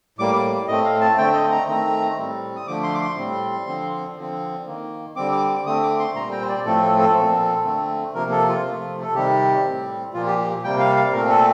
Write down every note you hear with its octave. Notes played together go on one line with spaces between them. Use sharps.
A2 G3 A#3 D6
D6
A2 A3 C4 D#5
F5
A5
D3 A3 C4 G5
D#5
A#5
D#3 A3 C4 A#5
A2 G3 C4
D#6
D3 F3 A3 D6
C6
D6
C6
A2 G3 C4
D3 F3 C4
D3 F3 C4
D#3 A#3
D3 G3 C4 D6
D6
D6
D3 A3 C4 D#6
D6
C6
A#2 G3 C4 A#5
G5
C5
D5
A2 F3 A3 C4 A4
A4
A4
A#2 F3 C4
D3 A3 C4
C3 F3 A#3 A#4
A4
F4
C3 F3 A3
A4
C3 D#3 G3 G4
A2 G3 C4
A#2 F3 A#3 F4
G4
G4
C3 G3 A#3 G5
F5
F5
A#2 A3 C4 A#4
A4